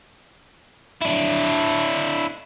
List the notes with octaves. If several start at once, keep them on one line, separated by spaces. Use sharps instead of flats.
D4 E4